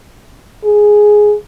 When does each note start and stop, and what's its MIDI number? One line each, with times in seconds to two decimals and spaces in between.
0.65 1.34 68